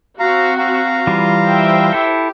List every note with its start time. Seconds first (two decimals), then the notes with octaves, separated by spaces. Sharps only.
0.20 C4 F#4 F5 A#5
0.58 F5 A#5
1.07 E3 G3 F4
1.48 C5 E5 G5
1.93 E4 G4 A4